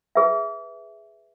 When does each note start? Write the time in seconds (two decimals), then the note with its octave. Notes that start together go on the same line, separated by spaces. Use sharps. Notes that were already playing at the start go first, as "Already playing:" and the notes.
0.15 G#4 B4 E5